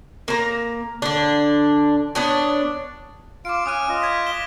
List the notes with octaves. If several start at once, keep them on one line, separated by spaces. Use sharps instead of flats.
A#3 A#5
D3 D4
B3 D4 C#5
F4 F5 D6 D7
C#4 D#6 F#6 D#7
F4 D#5
G#6 B6
B6 E7 G7